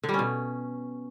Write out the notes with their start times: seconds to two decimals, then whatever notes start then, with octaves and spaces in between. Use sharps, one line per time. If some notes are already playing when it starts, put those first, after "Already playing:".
0.03 D3
0.09 G3
0.14 C#4
0.19 B2